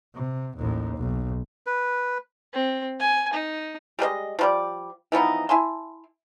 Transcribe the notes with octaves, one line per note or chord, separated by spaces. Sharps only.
C3
A1 D#2
B1
B4
C4
G#5
D#4
G3 G#3 B4 D#5
F3 G3 D5
E3 F3 B3 D#4
E4 G#5 A5 C6